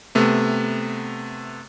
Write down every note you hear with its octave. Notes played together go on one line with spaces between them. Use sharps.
C3 A3 B3